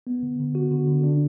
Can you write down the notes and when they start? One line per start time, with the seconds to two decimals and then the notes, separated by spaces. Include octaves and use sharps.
0.07 B3
0.23 D3
0.39 D3
0.55 F#4
0.71 D3
0.88 D3
1.04 D4